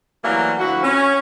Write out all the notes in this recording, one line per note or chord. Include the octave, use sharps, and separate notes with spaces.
E3 F#3 G3 A3 A#3 E4
D2 F3 E4 F#4
C#4